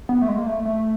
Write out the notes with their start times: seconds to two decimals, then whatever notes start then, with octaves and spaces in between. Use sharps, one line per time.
0.09 B3
0.22 A3
0.28 G#3
0.38 A#3
0.47 A3
0.65 A3